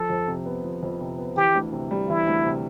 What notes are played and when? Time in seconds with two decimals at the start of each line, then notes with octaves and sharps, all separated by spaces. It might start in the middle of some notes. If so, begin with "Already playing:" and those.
Already playing: F3 A4
0.10 F2
0.28 C3
0.46 B3
0.64 F3
0.83 F2
1.00 C3
1.18 B3
1.37 E3 G4
1.55 D2
1.73 C3
1.91 G3
2.09 E3 E4
2.27 D2
2.45 C3